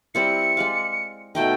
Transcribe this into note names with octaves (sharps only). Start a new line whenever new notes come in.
G3 C4 E4 C#7
G#3 D5 F5
B2 A3 D#4 G5